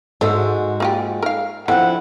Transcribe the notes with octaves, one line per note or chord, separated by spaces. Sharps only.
G#2 G#3 F#4 A4 E5
A#3 F4 G4
A#4 F5
D3 F3 C4 E4 F#5